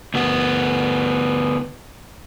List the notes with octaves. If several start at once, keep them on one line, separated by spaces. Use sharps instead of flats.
D2 B3